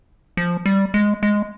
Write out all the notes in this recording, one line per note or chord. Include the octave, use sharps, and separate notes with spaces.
F3
G3
G#3
G#3